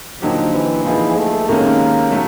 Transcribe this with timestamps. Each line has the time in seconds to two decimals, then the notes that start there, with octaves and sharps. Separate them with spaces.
0.22 D3 F3 F#3 A#3 D#4 G4
0.54 E3
0.85 E3 F3 A#3 D#4 G#4
1.17 A3
1.49 C3 D#3 G#3 A#3 C#4
2.12 F#3 A3